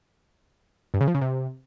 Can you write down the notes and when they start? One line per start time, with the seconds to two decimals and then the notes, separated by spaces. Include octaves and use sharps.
0.94 G2
1.01 C#3
1.08 F3
1.15 C#3
1.21 C3